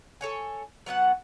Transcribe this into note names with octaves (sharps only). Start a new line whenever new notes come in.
A4 C#5 G#5
F#3 B3 E5 F#5